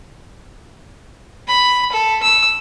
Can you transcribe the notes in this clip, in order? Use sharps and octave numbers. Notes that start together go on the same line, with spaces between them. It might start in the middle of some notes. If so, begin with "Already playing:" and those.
B5
A4
E6